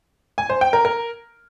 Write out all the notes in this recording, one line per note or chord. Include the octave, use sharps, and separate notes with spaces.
G#5
C5
G5
A#4
A#4